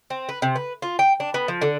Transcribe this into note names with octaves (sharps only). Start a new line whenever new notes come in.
C4
B4
C3
B4
F4
G5
D4
B3
F3
D3